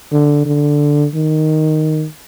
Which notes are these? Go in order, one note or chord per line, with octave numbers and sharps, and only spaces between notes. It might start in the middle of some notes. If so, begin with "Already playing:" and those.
D3
D3
D#3